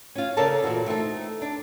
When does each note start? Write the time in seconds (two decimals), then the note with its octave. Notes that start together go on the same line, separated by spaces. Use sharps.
0.15 C#4 F4
0.37 C#3 A4 A#4 C#5 D5 A5
0.64 A#2 E3 E4 F#4
0.86 A3 C4 D#4 A4
1.42 D4 D5